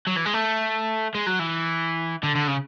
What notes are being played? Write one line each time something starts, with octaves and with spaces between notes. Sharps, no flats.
F#3
E3
G#3
A3
G#3
F#3
E3
D3
D3
C#3